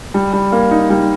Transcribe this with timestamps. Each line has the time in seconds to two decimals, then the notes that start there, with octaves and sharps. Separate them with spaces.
0.14 G3
0.33 G3
0.52 A#3
0.71 D#4
0.90 G3